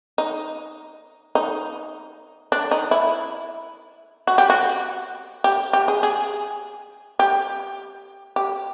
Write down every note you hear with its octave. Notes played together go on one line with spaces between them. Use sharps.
D#4
D#4
D4
D#4
E4
F#4
G4
F#4
G4
G4
G#4
G#4
G4
G4